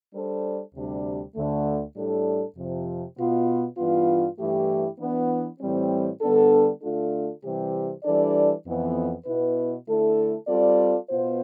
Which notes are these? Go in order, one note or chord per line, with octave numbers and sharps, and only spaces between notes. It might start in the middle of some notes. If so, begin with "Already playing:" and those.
G3 D4 A4 C5
D2 C3 G3 D4
D2 D3 A3
A2 G3 D4 A4
F2 C3 F3
B2 B3 F4
G2 E3 B3 F4
G2 E3 A3 E4 G4
E3 B3 D4
A2 E3 G3 C4
D3 G3 B3 D4 A4
D3 A3 D4 F4 A4
C3 E3 G3 C4 G4
E3 G3 D4 A4 D5
F2 E3 B3
B2 B3 E4 B4
D3 A3 E4 A4
G3 C4 F4 A4 D5
B2 B3 F4 C5